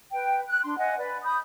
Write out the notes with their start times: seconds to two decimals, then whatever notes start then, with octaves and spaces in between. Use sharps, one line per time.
0.12 B4 G5
0.47 F#6
0.64 D4 C6
0.78 D#5 F5 F#5 G#5
0.97 B4 D5
1.24 B5 D#6 G6